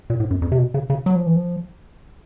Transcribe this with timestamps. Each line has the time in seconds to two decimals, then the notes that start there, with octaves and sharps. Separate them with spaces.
0.10 A#2
0.20 A2
0.31 F#2
0.42 F2
0.52 C3
0.58 B2
0.74 C#3
0.90 C#3
1.06 F#3
1.16 F3
1.26 E3
1.36 F3